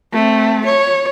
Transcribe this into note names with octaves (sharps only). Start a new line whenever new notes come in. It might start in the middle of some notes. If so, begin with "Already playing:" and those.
A3 C4
C#5